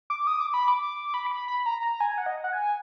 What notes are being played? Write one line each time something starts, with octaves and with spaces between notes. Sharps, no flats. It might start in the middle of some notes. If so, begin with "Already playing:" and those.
D6
D#6
D6
B5
D6
B5
D6
B5
B5
A#5
A#5
G#5
F#5
D#5
F#5
G#5